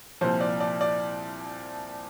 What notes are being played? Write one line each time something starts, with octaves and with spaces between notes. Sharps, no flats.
C2 A#2 F3 C5
D5
D5
D5